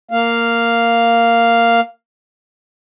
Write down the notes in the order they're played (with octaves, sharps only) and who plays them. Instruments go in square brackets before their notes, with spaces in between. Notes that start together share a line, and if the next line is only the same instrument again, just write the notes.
[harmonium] A#3 F5